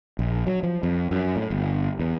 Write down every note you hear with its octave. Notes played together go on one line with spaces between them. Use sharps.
A#1
F#3
F3
F2
F#2
A2
G1
E2